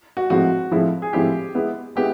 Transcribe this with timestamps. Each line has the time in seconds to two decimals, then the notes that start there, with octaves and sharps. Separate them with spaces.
0.17 F#4
0.30 A2 F3 G#3 C4 E4 F#4
0.71 A2 F3 G#3 C4 E4
1.02 G#4
1.13 A2 F3 G#3 C4 E4 G4
1.55 G#3 B3 E4
1.96 G#3 B3 E4 G4